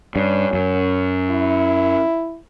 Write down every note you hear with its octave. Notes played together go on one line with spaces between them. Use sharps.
G2 C#4
F#2
E4